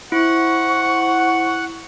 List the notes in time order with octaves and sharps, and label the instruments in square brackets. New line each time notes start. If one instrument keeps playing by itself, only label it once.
[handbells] E4 [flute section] C5 C#6 [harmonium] F#5